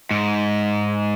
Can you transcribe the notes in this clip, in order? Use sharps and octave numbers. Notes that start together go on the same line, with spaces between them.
G#2